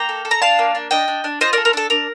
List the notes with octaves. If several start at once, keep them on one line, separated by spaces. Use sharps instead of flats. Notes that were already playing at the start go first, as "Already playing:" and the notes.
Already playing: A#3 G5 A#5
A4
A4
A#5
D4 F5 A5
A#3
D4
D4 D#5 G5
D4
D4
F4 C5 D#5
A#4 D5
A4
A#4
D4 A4
D4 A#4